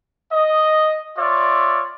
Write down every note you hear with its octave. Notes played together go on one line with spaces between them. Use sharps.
D#5
F4 C#5 D5 E5